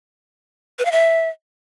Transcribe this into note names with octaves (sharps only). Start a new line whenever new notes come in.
B4
F5
E5